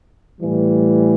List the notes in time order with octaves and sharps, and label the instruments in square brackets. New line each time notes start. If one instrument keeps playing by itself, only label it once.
[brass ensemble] A2 E3 G3